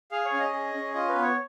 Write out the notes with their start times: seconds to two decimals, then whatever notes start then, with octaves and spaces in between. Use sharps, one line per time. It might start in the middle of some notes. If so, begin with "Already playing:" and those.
0.11 G#4 F5
0.25 C#5
0.32 C#4 F5
0.40 D#5
0.53 G#4
0.74 C#4
0.94 F4 D#5
1.08 B4
1.15 B3
1.22 C#5